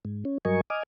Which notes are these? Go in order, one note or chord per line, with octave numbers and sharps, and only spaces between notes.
G#2
C#4
G2 F#3 A#4 D#5 G#5 C#6
D#5 G#5 D6 D#6 F6